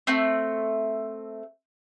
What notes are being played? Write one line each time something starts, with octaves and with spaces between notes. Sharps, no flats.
A3 C4